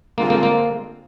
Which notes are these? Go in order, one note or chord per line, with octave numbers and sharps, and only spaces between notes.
D3 G#3 A#3 C4 F4
A#3
A#3